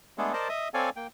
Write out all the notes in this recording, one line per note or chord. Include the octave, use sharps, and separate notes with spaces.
G#3 A3 B3 D4 G#4 A4
A#4 C5 D5 D#5 A5
D#5 E5 D#6
C4 A4 C#5 D5 F5 G#5
A#3 G5